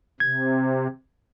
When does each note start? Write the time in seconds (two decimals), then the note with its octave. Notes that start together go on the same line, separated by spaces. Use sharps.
0.20 C3 G#6